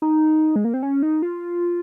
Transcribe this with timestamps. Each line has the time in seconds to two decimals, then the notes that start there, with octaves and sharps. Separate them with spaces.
0.02 D#4
0.56 G#3
0.65 A#3
0.74 C4
0.83 C#4
1.03 D#4
1.22 F4